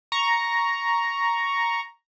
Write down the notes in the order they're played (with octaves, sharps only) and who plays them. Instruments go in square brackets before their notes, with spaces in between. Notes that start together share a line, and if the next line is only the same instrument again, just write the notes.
[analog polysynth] A#5 C#6